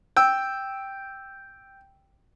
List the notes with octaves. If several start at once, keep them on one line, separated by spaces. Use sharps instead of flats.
G5 E6